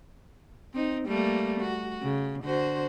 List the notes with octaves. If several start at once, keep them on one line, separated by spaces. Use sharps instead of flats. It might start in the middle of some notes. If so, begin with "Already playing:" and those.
C4 D#4
G3 A3 A#3
F#4
C#3
D3 F#4 C5